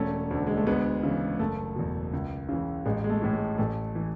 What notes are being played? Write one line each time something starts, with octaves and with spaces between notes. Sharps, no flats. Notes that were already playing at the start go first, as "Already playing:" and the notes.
Already playing: E1 A3 C#4
D2 D3
G#3
A3
D2 G#3 B3
C#3 E3
F#1 A3
E2 B2
C#2
C#3 E3
A1 G#3
G#3
A3
A2 E3
G#3
A1 A3
E3